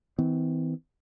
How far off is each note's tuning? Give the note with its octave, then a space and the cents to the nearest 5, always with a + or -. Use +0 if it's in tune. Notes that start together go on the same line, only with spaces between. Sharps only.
E3 -40 C4 -40